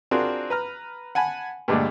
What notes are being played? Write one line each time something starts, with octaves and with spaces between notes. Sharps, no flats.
C4 D4 F4 F#4 G#4 A#4
B4 A#5 F6
F#5 G#5 A5 B5
G2 A#2 D3 G#3 A3